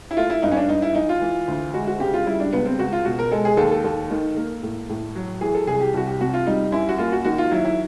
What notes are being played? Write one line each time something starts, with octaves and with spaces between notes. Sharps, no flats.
E4
A3 F4
E4
G2 D#4
C#4
D4
G2 D#4
E4
E3 D#4
F4
E3
D2
G#3 F#4
F#4
C#3 G4
F4
G3 E4
D4
C#2 B3
C4
C#2 F#4
F4
B2 F#4
A#4
G#3 A4
G#4
D#2 A4
A4
D#2 A4
D#3
A#3
A2
A2
F#3
E3 G#4
A4
C2 G#4
G4
C2 F#4
G4
C3 F#4
F4
G3 D#4
F#2 E4
F#4
A#3 F4
F#4
D#3 F#4
F4
F#3 E4
E4